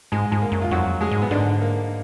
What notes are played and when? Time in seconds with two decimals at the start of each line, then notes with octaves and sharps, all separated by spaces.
0.12 G#2 G#3
0.32 G#2 G#3
0.42 A#3
0.52 F#2
0.62 F4
0.71 F2 F#3 F#4
1.01 G#3 G#4
1.11 G#2
1.22 B3
1.31 G#2 D3 D4
1.61 A#3